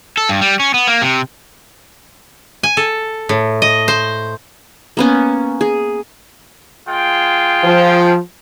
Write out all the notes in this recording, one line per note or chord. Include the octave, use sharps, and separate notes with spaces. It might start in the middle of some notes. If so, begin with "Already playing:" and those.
A4
G2
G3
C#4
B3
A#3
C3
G#5
A4
A2
D#5
C5
A#3 B3 C#4
G#4
G#3 F4 G5
F3